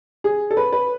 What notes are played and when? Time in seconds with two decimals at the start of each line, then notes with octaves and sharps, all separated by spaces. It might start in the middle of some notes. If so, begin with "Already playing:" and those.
0.24 G#4
0.51 A4
0.57 B4
0.73 B4